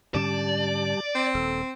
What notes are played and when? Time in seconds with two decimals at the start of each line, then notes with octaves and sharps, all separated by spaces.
0.15 G#2 D3 G3 C#4 G4 D5 A5
1.15 C4
1.35 D#1 A4